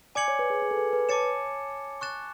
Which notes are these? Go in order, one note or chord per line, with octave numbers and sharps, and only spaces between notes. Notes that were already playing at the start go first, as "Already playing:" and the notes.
D5 G#5 D6 G#6 C#7 F#7
C#5
B4
G#4
G#4
A4
B4
B4
C#5 A5 D6 A6 C#7 E7
C#6 F#6 A6 E7